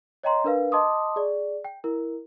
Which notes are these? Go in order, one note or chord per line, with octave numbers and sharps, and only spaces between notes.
C#5 D#5 G5 A#5 C6
D4 A#4 B4 F5
D#5 A5 C6 D6 D#6
G#4 D5
G5
E4 A#4